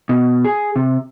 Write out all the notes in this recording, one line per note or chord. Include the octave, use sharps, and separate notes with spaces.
B2
G#4
C3